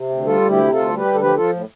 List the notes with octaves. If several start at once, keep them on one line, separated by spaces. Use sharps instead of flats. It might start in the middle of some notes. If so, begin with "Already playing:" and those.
Already playing: C3
D2
G3 F4 A4
D2
E4 G4
C3
D2 F4 A4
G3
G4 B4
D2
A4
F3 G4 B4
F3 F4 A4
A2